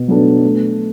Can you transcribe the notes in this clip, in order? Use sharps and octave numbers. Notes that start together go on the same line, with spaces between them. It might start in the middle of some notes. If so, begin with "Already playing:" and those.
Already playing: B2
F#3 B3 D4 A4
A3